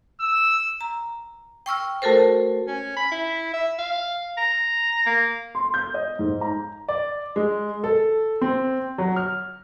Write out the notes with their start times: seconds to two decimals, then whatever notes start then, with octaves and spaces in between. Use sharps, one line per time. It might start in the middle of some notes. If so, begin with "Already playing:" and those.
0.20 E6
0.81 A#5
1.66 G5 C#6 E6 F6
2.02 A3 F#4 A4 A#4 C5
2.68 C#4
2.97 B5
3.12 E4
3.54 E5
3.79 F5
4.37 A#5
5.06 A#3
5.55 C6
5.74 G6
5.94 D#5
6.19 G#2
6.41 A#5
6.89 D5
7.36 G#3
7.84 A4
8.41 C4
8.98 F#3
9.16 F6